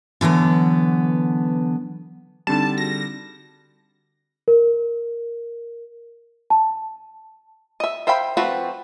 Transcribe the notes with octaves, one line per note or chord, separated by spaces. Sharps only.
D3 E3 F#3 B3
D3 G3 C4 D4 D#4 A5
F#4 G#4 A#6
A#4
A5
D#5 E5
C5 E5 F5 G5 B5
F3 A3 C4 F#4 B4